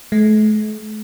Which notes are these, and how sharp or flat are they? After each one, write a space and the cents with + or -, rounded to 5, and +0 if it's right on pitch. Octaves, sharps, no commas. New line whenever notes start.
A3 -45